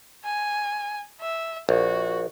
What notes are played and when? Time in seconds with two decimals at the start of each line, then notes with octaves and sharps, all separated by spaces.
0.25 G#5
1.21 E5
1.69 A#1 F#4